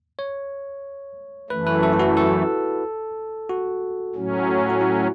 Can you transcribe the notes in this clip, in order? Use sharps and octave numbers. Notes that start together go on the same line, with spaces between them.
C#5
F#2 E3 A3 B4
B4
A4
E4
F#4
A4
F#4
A2 F#3 C#4
F#4
E4